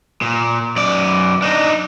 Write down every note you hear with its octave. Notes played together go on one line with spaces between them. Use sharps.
A#2
F#2 D5
D4 D#4